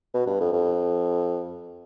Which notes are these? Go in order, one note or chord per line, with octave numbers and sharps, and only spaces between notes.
B2
G2
F2
F2